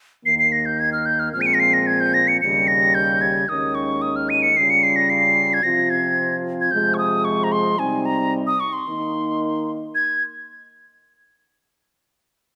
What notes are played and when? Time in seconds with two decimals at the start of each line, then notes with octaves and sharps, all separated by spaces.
0.25 D#2 D#3 A#3 C7
0.39 C7
0.52 A#6
0.66 G6
0.79 G#6
0.93 F6
1.06 G6
1.19 F6
1.33 A#2 F3 G#3 C4 F6
1.41 D#7
1.46 C#7
1.54 A#6
1.60 C7
1.73 A#6
1.87 G#6
2.00 G6
2.14 A#6
2.28 C#7
2.41 D#2 C#3 G3 C#7
2.68 A#6
2.95 G6
3.21 G#6
3.48 D#2 D#3 G#3 C#4 D#6
3.75 C#6
4.02 D#6
4.16 F6
4.30 D#7
4.42 C#7
4.56 C#3 G3 C#4 F4 C7
4.70 C#7
4.83 C7
4.96 A#6
5.10 C7
5.54 G#6
5.63 C3 F3 C4 F4 A#6
5.90 G#6
6.61 G#6
6.71 C3 F3 G#3 G6
6.94 C#6
6.98 D#6
7.25 C#6
7.44 A#5
7.52 C6
7.79 C3 G3 C4 D#4 G#5
8.06 A#5
8.47 D#6
8.60 C#6
8.73 C6
8.86 D#3 A#3 D#4
9.95 G#6